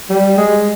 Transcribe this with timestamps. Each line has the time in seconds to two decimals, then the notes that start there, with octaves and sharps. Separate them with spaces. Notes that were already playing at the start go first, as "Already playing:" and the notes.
0.09 G3
0.37 G#3